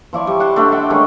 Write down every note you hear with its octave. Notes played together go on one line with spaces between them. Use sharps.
F3 E4 D5 C#6
G3
F#5 A5 C6
A3 D4 C5 B5
E5 F#5 G5 C6
D#3 G#3 C#4 D4